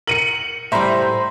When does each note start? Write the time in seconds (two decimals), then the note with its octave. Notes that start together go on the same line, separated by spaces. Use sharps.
0.07 A#4 C#7 D#7 F#7
0.72 A2 G3 C5 E5 A#5 B5